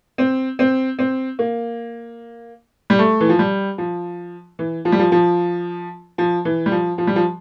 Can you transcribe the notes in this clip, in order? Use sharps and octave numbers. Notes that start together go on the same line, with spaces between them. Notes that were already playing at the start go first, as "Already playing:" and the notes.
C4
C4
C4
A#3
G3
A3
E3
F3
G3
F3
E3
F3
G3
F3
F3
F3
E3
G3
F3
F3
G3
F3